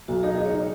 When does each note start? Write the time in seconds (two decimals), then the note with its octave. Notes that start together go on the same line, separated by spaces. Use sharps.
0.08 B1 F#4
0.23 D#4 G#4
0.38 D#4
0.46 C#5
0.54 D#4